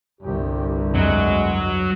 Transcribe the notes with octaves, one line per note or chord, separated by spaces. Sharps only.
G1 C2 G4
F2 F#3 G#3